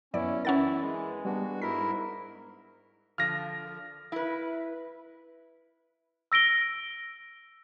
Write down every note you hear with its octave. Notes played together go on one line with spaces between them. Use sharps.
F#2 B3 C#4 E4 D5
E3 C#4 E4 A#4 F#5 A6
G#3
G3 B3 D4 F#4
G#2 E4 A#4 B6
D3 F3 F6 A#6
E4 B4
E6 A#6 D7 G7